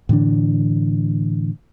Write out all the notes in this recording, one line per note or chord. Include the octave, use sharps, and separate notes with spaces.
A2 D3 E3 D4